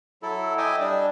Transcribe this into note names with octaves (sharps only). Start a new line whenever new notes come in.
F#3 E4 A4
D#5 E5 G5 G#5 D6 D#6
G3 D4 D5